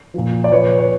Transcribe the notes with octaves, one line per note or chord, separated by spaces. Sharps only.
A#2 F3
D5
A#2 F3 B4 C#5
C#5